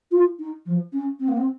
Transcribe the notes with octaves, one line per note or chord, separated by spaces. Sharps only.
F4
D#4
F3
C#4
C4
A#3
C4